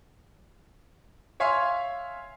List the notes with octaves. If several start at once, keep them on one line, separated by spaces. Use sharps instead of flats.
C#5 E5 F5 G#5 C6